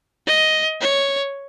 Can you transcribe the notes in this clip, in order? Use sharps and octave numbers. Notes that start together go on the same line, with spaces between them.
D#5
C#5